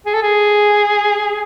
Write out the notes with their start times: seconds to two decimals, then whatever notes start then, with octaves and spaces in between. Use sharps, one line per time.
0.06 G#4
0.14 A4
0.22 G#4